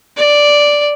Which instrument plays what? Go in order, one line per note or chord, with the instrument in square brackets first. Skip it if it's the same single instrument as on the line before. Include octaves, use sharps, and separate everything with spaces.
[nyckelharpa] D5